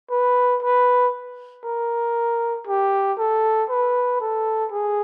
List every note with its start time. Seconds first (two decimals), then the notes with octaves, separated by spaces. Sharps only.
0.11 B4
0.62 B4
1.64 A#4
2.67 G4
3.18 A4
3.70 B4
4.20 A4
4.72 G#4